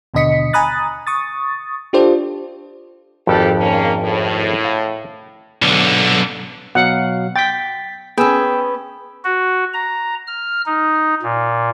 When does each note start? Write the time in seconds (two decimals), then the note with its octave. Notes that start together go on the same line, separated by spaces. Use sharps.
0.14 D#2 B2 D3 D#5 B6 C#7
0.53 G#5 A#5 B5 D#6 F#6 A6
1.07 C#6 D#6 A6
1.93 D4 F4 G4 A4 C5 D5
3.27 G#1 F2 F3 G4 A4
3.60 A#3 C#4
4.03 A2
4.64 F5
5.62 B1 D3
6.75 B2 F#3 F5 F#5
7.36 G5 A6 B6
8.18 B3 C#4 G#4 G5 E6
9.24 F#4
9.73 A#5
10.27 F6
10.66 D#4
11.22 A#2